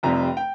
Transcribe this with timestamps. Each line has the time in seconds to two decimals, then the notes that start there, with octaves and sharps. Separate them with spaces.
0.03 F1 F2 C3 G3 C4 A#5
0.37 G5